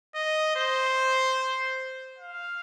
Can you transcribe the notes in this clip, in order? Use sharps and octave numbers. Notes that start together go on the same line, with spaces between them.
D#5
C5
F5